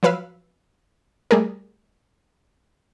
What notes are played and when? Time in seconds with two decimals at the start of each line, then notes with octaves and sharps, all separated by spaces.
0.03 F3 F#3 B4 F5 E6
1.31 G3 A3 G#4 A#4